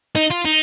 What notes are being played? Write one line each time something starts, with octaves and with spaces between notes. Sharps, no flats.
D#4
F4
D#4